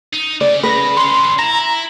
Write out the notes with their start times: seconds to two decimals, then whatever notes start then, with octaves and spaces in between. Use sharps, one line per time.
0.13 D#4
0.41 C#3 D5
0.63 B4 A#6
0.97 D3 C#4 C6
1.39 E4 A#5